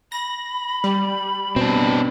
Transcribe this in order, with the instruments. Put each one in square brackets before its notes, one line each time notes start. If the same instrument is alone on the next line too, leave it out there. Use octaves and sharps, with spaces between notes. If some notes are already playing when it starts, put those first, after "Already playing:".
[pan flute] B5 [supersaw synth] A#6
[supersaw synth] G3
[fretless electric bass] B2 [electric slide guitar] C4 D4